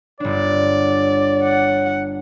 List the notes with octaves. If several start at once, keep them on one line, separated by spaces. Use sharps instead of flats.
G1 D4 C#5 D5
F#5